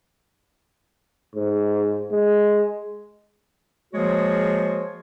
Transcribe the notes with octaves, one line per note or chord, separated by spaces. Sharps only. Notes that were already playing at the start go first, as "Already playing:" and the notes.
G#2
G#3
F3 G#3 A#3 F#4 G#4 C#5